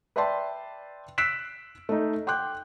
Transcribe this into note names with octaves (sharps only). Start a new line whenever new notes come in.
B4 D5 E5 G5 A5 C6
E6 F#6 B6 C7 D7 E7
A3 D#4
G5 C6 D6 F#6 G6